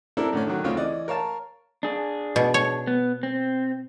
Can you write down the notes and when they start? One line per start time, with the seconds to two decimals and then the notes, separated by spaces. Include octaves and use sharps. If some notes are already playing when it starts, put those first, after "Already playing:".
0.17 C4 D4 E4 A4 A#4
0.33 A2 D3 C#4
0.47 D3 D#3 F#3 C#4
0.64 D2 C#3 C4 F4 C#5
0.76 E3 C#4 D5 D#5
1.08 A#4 C#5 F5 A5
1.83 D4 G#4
2.36 B2
2.54 C#5
2.87 B3
3.23 C4